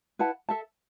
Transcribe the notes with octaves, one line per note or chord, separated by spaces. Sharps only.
E4 B4 F#5 A5
A4 E5 A5